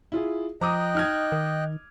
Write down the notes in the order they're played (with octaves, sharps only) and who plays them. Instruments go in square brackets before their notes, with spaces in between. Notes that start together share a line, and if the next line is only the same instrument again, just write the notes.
[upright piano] E4 F4 G#4
[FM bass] F3 [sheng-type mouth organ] D#5 G5 F#6 [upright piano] A#5 D6 D#6
[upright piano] D#4 F6 G#6
[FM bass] D#3